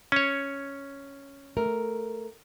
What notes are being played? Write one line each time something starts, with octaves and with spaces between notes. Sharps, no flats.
C#4 C#5
A3 A#4